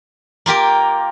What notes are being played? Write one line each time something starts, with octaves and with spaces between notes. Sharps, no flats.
A#3 F4 G4 A#4